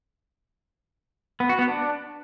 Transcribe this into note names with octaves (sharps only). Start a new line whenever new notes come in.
B3
F#4
B3
D4